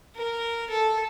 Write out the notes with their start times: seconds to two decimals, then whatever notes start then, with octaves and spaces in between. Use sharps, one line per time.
0.15 A#4
0.70 A4